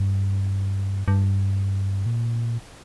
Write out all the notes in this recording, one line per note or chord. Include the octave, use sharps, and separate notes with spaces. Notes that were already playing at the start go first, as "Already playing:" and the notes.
Already playing: G2
G2
A#2